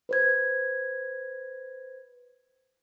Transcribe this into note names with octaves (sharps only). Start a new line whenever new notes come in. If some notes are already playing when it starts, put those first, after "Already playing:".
B4 C5 G#6